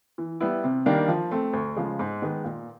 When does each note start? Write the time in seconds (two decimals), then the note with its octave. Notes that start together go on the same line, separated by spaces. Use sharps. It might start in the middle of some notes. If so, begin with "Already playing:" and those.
0.18 E3
0.40 G3 B3 E4
0.64 C3
0.86 D#3 G3 A#3 D4
1.08 F3
1.31 A3 C4
1.53 D2
1.76 C#3 F3 G#3
1.99 G#2
2.22 D#3 G#3 B3
2.44 A#2